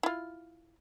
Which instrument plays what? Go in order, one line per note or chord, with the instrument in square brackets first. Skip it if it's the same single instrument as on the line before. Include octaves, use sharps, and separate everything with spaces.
[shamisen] E4 F4